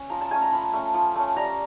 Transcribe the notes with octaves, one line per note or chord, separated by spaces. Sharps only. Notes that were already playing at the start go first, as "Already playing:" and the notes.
Already playing: C#4
F3 A#5
A5
A3 C#4 G#5
A#5
F3 B5
A3 C#4
F3
A3 C#4
G3 A#5